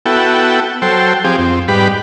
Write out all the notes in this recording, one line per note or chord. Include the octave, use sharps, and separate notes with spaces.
B3 E4 F#4 A4 G5
F#3 A4 C5 G5
F3 C4 G4 G#4
F2 C4
G#2 G3 G4 B4 B5